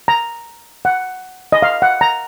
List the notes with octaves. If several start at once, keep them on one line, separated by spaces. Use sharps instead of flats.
A#5
F#5
D#5
F5
F#5
A#5